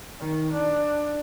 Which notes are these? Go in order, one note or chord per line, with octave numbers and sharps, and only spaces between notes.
D#3
D4